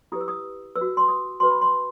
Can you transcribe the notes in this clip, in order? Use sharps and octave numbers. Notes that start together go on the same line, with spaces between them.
E4 G4 B4 D#6
E6
D#6
B4 E6
F#4
C6
D#6
F#4 B4 C6
B5
C6